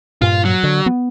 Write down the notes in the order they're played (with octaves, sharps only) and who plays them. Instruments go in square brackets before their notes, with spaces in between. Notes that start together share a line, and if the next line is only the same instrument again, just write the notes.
[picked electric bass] G2 A#2 [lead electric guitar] F4
[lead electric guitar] F#3
[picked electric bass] D3
B3